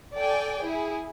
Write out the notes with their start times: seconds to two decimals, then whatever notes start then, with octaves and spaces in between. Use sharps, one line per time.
0.16 A4 D5 G5 G#5
0.61 E4 G#4